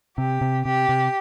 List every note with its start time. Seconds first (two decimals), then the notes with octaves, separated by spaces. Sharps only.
0.17 C3 G4
0.41 C3
0.65 C3 G4
0.89 C3